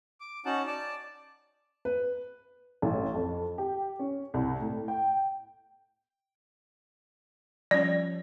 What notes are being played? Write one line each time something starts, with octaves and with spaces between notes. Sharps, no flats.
D6
C#4 D#4 F#4 F#5 A5
D5 A5
B4
A1
F2
G4
C#4
C2
A2
G5
F3 G3 C#4 D5